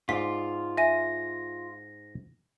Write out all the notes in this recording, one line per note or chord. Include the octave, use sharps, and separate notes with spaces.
G#2 F4 D5 B6
E5 G#5 A#6 D#7